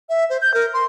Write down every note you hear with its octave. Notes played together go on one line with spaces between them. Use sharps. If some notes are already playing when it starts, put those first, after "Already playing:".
E5
C5
G6
A#4
C6